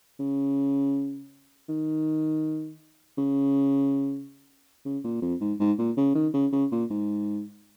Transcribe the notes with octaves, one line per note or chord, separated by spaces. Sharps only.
C#3
D#3
C#3
C#3
A#2
F2
G#2
G#2
A#2
C#3
D#3
C#3
C#3
A#2
G#2